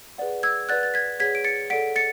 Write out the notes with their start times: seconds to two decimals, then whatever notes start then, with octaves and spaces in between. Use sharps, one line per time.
0.18 G#4 B4 D5 F#5
0.43 E6 G#6
0.69 B4 D5 F#5 F#6 A6
0.83 A6
0.94 G#6 B6
1.20 G#4 C#5 F#5 G#6 B6
1.35 D7
1.44 A6 C#7
1.70 A4 D5 F#5 B6 D7
1.96 A6 C#7